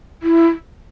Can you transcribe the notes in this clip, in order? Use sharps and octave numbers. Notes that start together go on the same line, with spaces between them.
E4